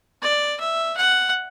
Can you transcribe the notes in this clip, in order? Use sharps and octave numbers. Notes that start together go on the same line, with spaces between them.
D5
E5
F#5